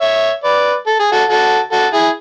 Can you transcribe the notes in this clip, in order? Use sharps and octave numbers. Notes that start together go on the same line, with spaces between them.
C#5 E5
B4 D5
A4
G#4
F#4 A4
F#4 A4
F#4 A4
E4 G#4